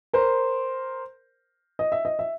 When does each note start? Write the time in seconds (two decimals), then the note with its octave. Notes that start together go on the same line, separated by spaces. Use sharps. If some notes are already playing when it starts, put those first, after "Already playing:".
0.13 A#4 C5
1.79 D#5
1.92 E5
2.05 D#5
2.19 E5